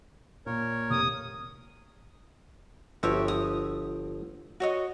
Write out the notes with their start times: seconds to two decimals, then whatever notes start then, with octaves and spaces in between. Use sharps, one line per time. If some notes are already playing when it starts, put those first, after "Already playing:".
0.46 A#2 A#4 C#5
0.90 F1 D#6
3.03 G1 F3 F#4 G4 C#5 E5
3.28 D#6
4.60 F#4 C#5 D#5